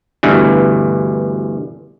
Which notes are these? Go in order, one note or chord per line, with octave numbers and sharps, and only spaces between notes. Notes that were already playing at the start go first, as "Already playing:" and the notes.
D2 G2 B2 E3